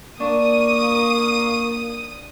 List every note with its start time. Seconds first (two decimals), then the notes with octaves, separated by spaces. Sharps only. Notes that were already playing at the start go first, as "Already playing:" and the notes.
0.20 A#3 D4 C#6 D#6 D#7